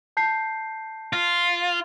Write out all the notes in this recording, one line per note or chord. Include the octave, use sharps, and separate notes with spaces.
A5 G6 C7
F4